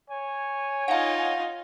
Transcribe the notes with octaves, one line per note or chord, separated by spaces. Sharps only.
C#5 G#5
D#4 F4 F5 F#5